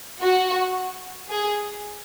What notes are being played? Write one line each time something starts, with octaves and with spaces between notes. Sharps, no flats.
F#4
G#4